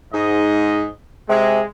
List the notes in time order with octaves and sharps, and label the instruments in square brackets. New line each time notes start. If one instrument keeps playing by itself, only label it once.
[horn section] G#2 D#5
[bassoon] C3 [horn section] G#3